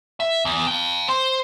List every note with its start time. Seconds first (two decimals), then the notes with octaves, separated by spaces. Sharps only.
0.20 E5
0.45 E2
0.67 F5 G5
1.08 C5